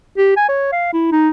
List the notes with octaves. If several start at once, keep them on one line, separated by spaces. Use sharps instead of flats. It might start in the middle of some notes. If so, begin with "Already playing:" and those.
G4
G#5
C#5
F5
E4
D#4